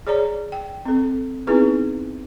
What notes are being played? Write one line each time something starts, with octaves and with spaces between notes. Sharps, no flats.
G#4 C#5 D5 A#5
G5
C4 A4
B3 C4 D#4 E4 G#4 B4